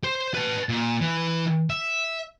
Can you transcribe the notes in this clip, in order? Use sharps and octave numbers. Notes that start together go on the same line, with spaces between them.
C5
B4 A5
A#2
E3
E5